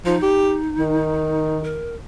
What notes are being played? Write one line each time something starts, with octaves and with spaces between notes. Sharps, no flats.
F3 D#4
G4
D#3
A#4